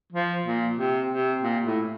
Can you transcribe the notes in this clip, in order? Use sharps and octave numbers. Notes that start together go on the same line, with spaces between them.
F3
A#2
C3
C3
A#2
A2